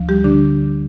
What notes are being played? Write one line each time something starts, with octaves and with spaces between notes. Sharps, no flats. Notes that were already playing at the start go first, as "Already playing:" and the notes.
Already playing: D2 F3
G3 G4
D3 D4